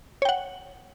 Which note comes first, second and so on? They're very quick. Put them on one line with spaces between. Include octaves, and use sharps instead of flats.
C#5 G5 F#5